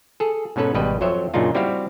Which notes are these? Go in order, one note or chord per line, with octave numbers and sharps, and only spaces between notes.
G#4 A4
G#2 B2 C#4 A4 B4
G#1 B2 G3 B4 D#5
F2 F#3 C5 C#5 E5
F#2 A#2 C#3 D4 D#4 F4
G3 C4 E4 F#4 G4 F5